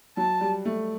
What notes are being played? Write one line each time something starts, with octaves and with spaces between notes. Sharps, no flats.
F#3 A5
G3
A3